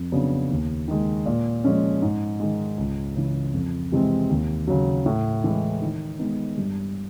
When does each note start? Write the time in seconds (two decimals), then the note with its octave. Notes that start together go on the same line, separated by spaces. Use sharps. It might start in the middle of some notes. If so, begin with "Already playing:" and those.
Already playing: F2
0.12 C#3 F#3 B3 D4
0.50 D#2
0.88 D#3 G#3
1.26 A#2
1.64 F3 G#3 C#4
2.02 G#2
2.40 D#3 G#3
2.78 C#2
3.16 C#3 E3
3.53 F2
3.92 C3 E3 G#3 C4
4.30 D#2
4.67 C#3 F#3
5.06 A2
5.44 E3 G#3
5.82 D#3
6.19 G#3 B3 D#4
6.57 G2